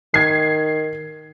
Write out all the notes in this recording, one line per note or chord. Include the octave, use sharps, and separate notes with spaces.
D#3 G#6 C7